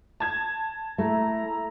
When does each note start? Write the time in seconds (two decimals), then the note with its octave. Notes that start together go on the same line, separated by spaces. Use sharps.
0.20 A5 G#6
0.98 A3 E4 E5 A#5